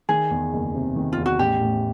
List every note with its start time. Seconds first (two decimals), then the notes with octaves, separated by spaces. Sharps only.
0.09 D#3 G#4
0.31 E2
0.53 F#1
0.74 C3
0.96 D#3
1.13 E2 F4
1.26 F#4
1.39 A1 G4
1.61 A2